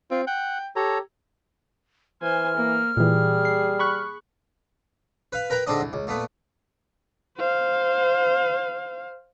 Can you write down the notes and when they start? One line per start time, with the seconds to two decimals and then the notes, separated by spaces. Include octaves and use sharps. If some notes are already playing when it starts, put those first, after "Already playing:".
0.11 C4 F4
0.27 F#5 G5
0.76 G4 A4 C#5 A#5
2.22 E3 C5 G#5 F6
2.56 A#3
2.97 A#2 E3 G3 G#4
3.45 C7
3.79 B5 C#6 F#6
5.32 B4 F5
5.50 A#4 B4 G5 A#5
5.67 G#2 D3 C4 D4 D#5
5.80 C2
5.93 C#2
6.07 A#2 A3 B3
7.37 C5 F5